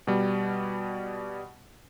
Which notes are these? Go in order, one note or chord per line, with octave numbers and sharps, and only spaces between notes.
B2 G3